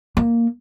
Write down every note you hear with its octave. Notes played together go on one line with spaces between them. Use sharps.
A#3